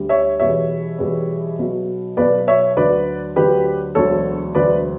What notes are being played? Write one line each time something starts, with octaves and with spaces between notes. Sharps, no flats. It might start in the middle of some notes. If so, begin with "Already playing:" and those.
Already playing: D2 D3 G3
C#5 E5
E2 B2 G3 C#5 E5
E2 B2 G3
B1 B2 F#3
B1 B2 F#3 B4 D5
C#5 E5
D2 D3 F#3 B4 D5
D2 D3 F#3 G4 B4
E1 D2 D3 F#3 A4 C#5
E1 D2 D3 F#3 B4 D5